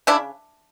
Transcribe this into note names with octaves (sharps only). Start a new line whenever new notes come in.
C#3 D4 E4